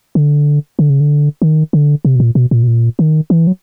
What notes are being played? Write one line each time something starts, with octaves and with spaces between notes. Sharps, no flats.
D3
D3
C#3
D3
D#3
D3
C3
B2
A#2
B2
A#2
B2
A#2
D#3
E3
F#3